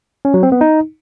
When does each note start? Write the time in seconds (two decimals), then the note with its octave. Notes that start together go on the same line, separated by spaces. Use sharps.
0.25 C#4
0.34 F#3
0.43 C4
0.52 B3
0.61 D#4